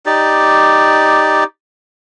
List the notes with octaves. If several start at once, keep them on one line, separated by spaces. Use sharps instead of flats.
D#4 G4 D5